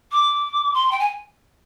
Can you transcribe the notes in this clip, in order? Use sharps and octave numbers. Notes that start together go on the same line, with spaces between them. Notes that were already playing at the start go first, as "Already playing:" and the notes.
D6
C6
G5
G#5